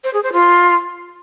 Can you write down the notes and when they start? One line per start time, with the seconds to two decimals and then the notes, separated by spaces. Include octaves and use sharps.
0.04 C5
0.14 G#4
0.23 C5
0.33 F4